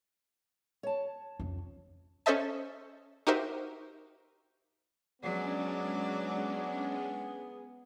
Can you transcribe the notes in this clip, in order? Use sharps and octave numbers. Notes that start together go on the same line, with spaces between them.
C#5 A5
F2 C#3
C#4 A4 C5 D#5 E5 A5
D#4 F#4 G4 A#4 C5 E5
F#3 G#3 B3 C#4 D4 G#4 D5